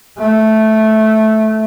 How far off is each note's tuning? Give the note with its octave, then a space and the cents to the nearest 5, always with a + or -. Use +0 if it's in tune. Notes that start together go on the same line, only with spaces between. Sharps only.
A3 -10